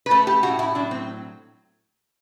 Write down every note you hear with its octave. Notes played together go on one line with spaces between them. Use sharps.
B4
A3 A4
G4
A2 F#4
E4
F#3 D4
C4